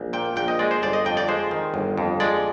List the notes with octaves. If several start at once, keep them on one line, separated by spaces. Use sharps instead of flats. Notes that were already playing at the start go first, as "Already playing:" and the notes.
Already playing: A#1
A#2 G5
A#1 G5
D#5
G#3 D5
C5
G1 D5
D#5
F2 G5
D5
G#3 C5
D#3
G1
F2
G#3 D5